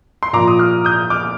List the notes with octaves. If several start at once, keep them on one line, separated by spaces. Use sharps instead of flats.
C6
A#2 F3 A#5 D6
D#6
D6 F6
D#6 G6
D6 F6